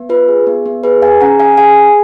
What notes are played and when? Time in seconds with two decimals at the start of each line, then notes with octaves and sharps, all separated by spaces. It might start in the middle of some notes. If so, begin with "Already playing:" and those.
Already playing: B3
0.09 F4 B4
0.28 G#4
0.47 B3
0.66 B3
0.84 G#4 B4
1.02 G#4 F5 G#5
1.21 C#4 F#5 A#5
1.39 C#4 F5 G#5
1.57 G#4 F5 G#5
1.76 G#4